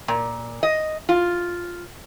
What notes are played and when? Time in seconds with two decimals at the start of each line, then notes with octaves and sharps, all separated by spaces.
0.08 A#2
0.63 D#5
1.09 F4